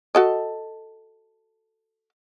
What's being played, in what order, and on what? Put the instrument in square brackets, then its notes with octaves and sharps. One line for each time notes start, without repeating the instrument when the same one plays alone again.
[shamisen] F#4 A4 D#5